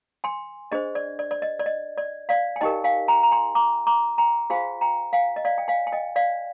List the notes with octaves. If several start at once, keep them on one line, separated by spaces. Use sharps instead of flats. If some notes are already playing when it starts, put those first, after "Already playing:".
G#5 C6
D4 G#4 C5 D#5
D5
D5
D5
D#5
D5
D#5
D5
D5 F5
G#5
D#4 G4 A#4 D#5 G5
F5 G#5
G5 A#5
A#5
G#5 C6
A#5 D6
A#5 D6
G5 A#5
F4 G#4 C5 F5 G#5
G5 A#5
F5 G#5
D#5
D5 F5
G5
F5 G#5
G#5
D#5 G5
D5 F5